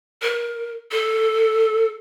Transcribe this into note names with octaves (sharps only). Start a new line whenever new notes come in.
A#4
A4